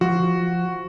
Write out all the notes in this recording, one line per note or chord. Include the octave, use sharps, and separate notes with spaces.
F3 F#4